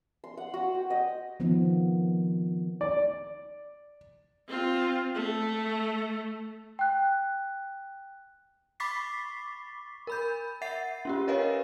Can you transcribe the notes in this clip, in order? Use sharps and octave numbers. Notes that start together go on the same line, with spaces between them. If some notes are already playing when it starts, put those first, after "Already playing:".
C6
F#5
F#4
G5
D#5
D#3 F3 B3
D5
C4 F4
A3
G5 F#6
B5 C#6 D6 A6 B6 C7
A#4 B5 G6
E5 F#5 A6 C7
C#4 F4 G4
A#4 B4 C#5 D#5 F5